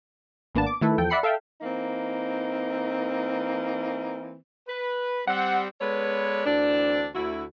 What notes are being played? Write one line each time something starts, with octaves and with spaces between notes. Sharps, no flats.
G#1 A#3 B3 D4 A5
D6
D#3 A3 E4 A4 B4
E2 F3 A4 G5
D5 E5 F#5 B5 C7 C#7
A4 E5 F5 G5
E3 A#3 C4 D#4
B4
G3 C4 F#5
G#3 B3 A4 B4 C#5 D5
D2 E3 C4 D4
D2 E4 F#4